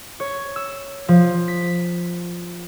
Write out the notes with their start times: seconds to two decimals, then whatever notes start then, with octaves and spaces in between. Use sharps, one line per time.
0.20 C#5
0.56 E6
1.08 F3
1.48 B6